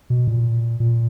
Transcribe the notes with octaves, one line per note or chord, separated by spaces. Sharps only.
B2
A#2
A#2